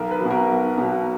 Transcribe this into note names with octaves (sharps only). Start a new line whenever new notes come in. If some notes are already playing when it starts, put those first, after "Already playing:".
Already playing: B1 A#4
B4
B2 F#3
A#4
B1
B2 F#3